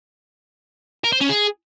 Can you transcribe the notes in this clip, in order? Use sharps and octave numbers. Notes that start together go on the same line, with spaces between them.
A#4
C5
C#4
G#4